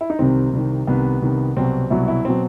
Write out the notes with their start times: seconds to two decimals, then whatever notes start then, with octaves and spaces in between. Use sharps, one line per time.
0.01 E4
0.10 D#4
0.19 C2 C3 D#3 C4
0.53 C2 C3 D#3
0.87 C2 C3 D#3 B3
1.22 C2 C3 D#3
1.56 C2 B2 F#3 C4
1.90 C2 B2 F#3 E4
2.08 E4
2.25 B2 F#3 C4